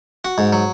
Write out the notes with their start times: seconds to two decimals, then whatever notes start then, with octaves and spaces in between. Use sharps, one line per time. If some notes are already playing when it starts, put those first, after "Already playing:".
0.25 F#4
0.38 G#2
0.53 F#3